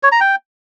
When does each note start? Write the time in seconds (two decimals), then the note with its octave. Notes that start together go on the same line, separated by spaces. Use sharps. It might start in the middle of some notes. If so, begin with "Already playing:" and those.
0.03 C#5
0.12 A#5
0.21 G5